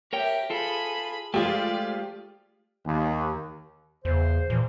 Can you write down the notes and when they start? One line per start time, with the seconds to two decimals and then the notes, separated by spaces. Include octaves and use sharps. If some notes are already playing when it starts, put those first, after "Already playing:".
0.13 G4 A#4 C#5 E5 G5
0.50 F4 G#4 A4 B5
1.34 F3 G#3 A3 F4 G4 D5
2.86 D#2
4.05 E2 C#3 C5
4.50 A#2 E3 F3